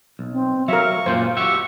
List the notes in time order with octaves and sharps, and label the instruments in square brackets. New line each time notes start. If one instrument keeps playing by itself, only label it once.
[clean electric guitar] B1
[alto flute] C4
[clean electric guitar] F#3 [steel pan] A#4 E5 [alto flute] F5 [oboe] C#6
[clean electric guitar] F#2 A#2 [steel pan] C5
[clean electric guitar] F#4 G4 E5 [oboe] C#6